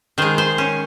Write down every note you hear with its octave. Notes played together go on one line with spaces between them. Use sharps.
D#3 G#3 C5
C5
C#4